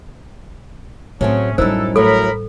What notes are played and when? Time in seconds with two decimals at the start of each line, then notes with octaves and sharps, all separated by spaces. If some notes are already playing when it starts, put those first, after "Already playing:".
1.21 A2 F#3 A3 C4 C#4 G#4
1.58 A1 F#2 G3 D#4 E4 A4 C5 E6
1.96 A2 F#3 A4 A#4 B5